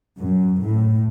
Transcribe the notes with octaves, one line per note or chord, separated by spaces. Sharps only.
F#2
A2